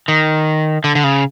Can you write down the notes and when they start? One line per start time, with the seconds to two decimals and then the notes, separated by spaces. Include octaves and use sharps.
0.08 D#3
0.84 D3
0.95 D3
1.04 C#3